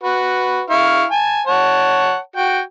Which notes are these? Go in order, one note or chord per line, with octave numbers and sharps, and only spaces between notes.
F#4 B4
E4 F5 C#6
G#5 A5
C#5 F#5 A5
F#4 G5